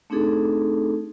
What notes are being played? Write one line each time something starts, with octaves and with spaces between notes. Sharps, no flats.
A3 C4 D4 D#4 G#4 A4